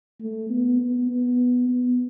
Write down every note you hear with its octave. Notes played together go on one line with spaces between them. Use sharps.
A3
B3
B3
B3
B3